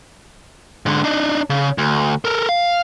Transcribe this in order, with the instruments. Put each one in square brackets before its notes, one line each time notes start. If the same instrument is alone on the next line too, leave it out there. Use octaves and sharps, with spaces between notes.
[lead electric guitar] G#2 D3
D4 D#4
C#3
D2
A4 A#4
F5